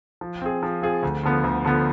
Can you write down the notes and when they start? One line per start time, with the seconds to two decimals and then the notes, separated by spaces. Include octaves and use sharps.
0.21 F3
0.42 C4 F4 G#4
0.63 F3
0.82 C4 F4 G#4
1.03 D2
1.23 D3 F3 B3
1.44 D2
1.65 D3 F3 B3